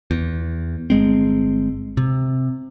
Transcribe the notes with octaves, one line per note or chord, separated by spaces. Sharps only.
E2
G1 G#3 C4
C3